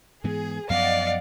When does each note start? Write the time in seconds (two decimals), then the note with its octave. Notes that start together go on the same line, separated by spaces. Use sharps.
0.24 G#2 E3 B3 G#4
0.70 F#2 F3 B3 D5 D#5 F5 F#5